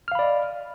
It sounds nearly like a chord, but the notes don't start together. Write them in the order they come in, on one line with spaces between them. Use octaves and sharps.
F6 F5 B5 D5 D#5